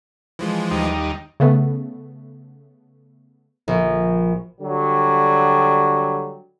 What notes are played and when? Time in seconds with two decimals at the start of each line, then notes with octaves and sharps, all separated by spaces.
0.39 E3 F3 G#3
0.71 D#2 G3 D#4
1.40 C#3 A3 B3
3.68 A#1
4.61 D3 F#3 G3